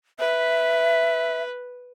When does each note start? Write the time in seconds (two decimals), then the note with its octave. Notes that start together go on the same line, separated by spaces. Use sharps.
0.19 B4 E5